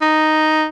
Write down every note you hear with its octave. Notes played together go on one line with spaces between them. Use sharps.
D#4